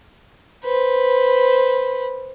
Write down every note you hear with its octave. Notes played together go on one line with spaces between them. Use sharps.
B4 C5